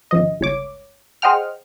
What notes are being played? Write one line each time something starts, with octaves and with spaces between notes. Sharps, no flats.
G#1 C#3 F3 D#5
G1 C#2 C#5 D6
G#4 C5 D#5 F#5 G5 F6